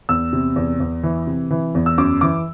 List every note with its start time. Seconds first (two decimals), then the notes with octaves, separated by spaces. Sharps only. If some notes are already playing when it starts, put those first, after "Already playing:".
0.09 E2 E6
0.33 C3
0.56 E2
0.80 E2
1.03 E3
1.27 C3
1.51 E3
1.75 E2
1.86 E6
1.98 F#2 D6
2.21 E3 D6